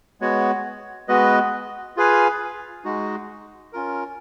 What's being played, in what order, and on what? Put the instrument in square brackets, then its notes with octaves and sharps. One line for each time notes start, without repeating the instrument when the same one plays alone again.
[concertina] G#3 B3 F#4 C#5
G#3 B3 F#4 B4 D#5
F4 G#4 B4 F5 G#5
G#3 D#4 F#4
C#4 F4 A#4